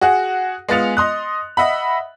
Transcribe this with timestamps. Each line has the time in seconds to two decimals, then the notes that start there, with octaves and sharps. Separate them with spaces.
0.01 F#4 G#4 F#5
0.69 G#3 B3 F4 A6 C#7 F7
0.97 D#5 C6 D#6 F#6
1.57 D#5 E5 F#5 B5